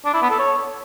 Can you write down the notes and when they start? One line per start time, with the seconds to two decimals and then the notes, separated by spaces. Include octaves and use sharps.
0.05 D4
0.14 E4
0.22 B3
0.31 A4
0.39 C#5